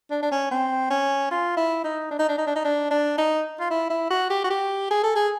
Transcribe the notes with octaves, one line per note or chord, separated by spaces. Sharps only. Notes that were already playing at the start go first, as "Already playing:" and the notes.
D4
D4
C#4
C4
C#4
F4
E4
D#4
D4
D#4
D4
D#4
D4
D#4
D4
D4
D#4
F4
E4
E4
F#4
G4
F#4
G4
G#4
A4
G#4